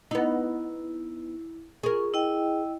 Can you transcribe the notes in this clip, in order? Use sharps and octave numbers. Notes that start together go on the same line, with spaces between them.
B3 D#4 E4
F4 G#4 A#4 C#6
E4 D#5 G5